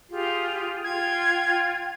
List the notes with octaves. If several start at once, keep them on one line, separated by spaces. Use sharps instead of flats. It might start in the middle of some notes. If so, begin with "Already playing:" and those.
F4 G4 G#4
F4 G5 G#6